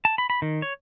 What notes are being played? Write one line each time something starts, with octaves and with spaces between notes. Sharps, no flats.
A5
B5
B5
D#3
C#5